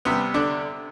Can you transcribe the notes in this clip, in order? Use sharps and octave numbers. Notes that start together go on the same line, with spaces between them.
C3 G3 B3
D3 D4